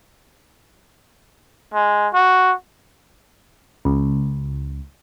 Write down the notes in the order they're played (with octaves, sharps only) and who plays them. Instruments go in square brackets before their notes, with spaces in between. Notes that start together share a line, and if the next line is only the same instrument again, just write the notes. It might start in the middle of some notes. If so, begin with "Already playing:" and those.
[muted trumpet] G#3
F#4
[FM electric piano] C#2